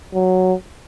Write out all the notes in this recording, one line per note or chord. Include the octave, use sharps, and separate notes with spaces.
F#3